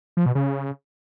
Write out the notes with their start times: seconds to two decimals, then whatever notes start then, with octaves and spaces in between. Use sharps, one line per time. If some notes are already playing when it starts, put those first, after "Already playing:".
0.17 F3
0.26 B2
0.35 C#3